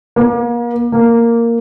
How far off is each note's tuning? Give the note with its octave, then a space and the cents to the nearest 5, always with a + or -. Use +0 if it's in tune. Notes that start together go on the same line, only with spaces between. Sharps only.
A#3 +35
A#3 -5